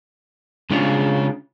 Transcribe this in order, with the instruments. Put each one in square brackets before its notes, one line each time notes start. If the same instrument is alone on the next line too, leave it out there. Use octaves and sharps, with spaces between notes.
[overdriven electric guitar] C#3 C#4 [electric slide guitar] G#3 D4 F4